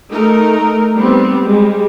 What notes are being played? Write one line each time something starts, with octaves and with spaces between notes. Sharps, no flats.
A3 D#4 A#4
G3 B3 C4
G3 G#3